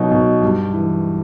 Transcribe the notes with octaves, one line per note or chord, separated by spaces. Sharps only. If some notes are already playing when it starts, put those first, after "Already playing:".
Already playing: B2 F#3 D#4
B2
G2
E3